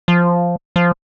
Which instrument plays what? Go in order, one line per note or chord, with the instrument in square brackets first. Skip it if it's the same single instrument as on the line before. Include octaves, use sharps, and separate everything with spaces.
[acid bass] F3
F3